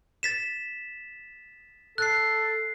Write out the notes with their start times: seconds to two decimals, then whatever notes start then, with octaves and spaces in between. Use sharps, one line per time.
0.23 A6 B6 E7
1.98 A4 F#6 C7